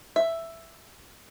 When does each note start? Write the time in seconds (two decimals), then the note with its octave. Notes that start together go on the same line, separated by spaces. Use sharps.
0.16 E5